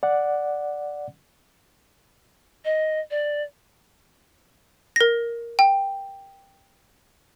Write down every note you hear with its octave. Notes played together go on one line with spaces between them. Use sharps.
D5 F#5
D#5
D5
A#4 A#6
G5